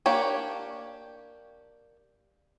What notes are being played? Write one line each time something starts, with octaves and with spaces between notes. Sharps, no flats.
A#3 D4 G4 C#5